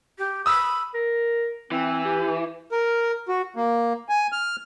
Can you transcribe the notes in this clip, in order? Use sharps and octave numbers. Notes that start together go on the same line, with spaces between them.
G4
B5 D#6 E6
A#4
E3 C4
G4
A#4
F#4
A#3
G#5
F6